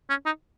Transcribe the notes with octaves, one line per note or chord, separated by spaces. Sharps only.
C#4
D#4